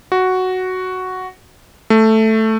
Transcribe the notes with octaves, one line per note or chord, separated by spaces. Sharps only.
F#4
A3